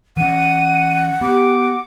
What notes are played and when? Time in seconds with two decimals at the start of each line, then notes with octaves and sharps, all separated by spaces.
0.17 E3 C#4 F#5 D#7
1.21 B3 G4 D6